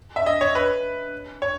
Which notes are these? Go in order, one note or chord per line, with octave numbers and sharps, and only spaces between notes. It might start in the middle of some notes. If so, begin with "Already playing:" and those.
E5
D#5
C#5
B4
C#5